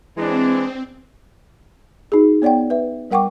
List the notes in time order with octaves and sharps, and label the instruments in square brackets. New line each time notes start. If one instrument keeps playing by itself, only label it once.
[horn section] E3 G#3 D4 [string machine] C4
[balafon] D#4 F#4 G#4
B3 C#5 D5 F#5 G5
B4 E5
G3 A#4 F#5 G5 C#6 D6